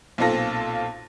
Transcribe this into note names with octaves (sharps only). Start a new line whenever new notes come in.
B1 A#2 C4 F4 A4 A#6